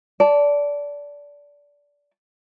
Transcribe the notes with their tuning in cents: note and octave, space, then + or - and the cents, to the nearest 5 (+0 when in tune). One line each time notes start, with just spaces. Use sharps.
D5 -20 A5 +0